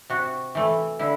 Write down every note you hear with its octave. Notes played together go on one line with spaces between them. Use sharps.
C3 F#4
E3 A3
D3 E4